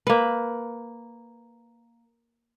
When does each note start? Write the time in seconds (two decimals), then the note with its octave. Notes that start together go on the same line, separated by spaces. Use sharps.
0.07 A#3 B4